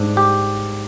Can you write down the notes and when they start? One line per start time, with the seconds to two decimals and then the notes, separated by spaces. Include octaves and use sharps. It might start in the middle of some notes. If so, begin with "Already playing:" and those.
Already playing: G#2 G3 D4
0.17 G4